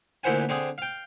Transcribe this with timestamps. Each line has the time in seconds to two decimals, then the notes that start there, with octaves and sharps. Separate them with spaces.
0.24 D2 A#2 E4 C5 F#5 G#5
0.49 D3 C4 G#4
0.78 F5 G5